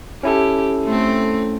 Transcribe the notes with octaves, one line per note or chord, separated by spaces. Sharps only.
C#4 E4 G4 A4
A3 C4